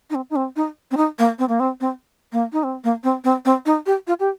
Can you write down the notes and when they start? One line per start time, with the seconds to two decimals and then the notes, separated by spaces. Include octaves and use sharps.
0.10 D#4
0.15 C4
0.30 D#4
0.36 C4
0.56 D#4
0.91 C4
0.97 D#4
1.19 A#3
1.39 C4
1.49 A#3
1.60 C4
1.81 C4
2.32 A#3
2.53 D#4
2.64 C4
2.84 A#3
3.04 C4
3.24 C4
3.45 C4
3.66 D#4
3.86 G4
4.07 F4
4.20 G4